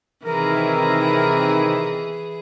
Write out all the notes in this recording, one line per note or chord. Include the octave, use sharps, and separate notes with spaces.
C3 D#3 E3 E4 G#4 A#4